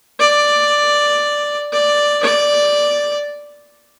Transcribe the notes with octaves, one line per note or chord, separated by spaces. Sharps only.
D5
D5
D5